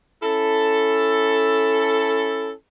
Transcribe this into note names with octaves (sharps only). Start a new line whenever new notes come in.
C#4 E4 A4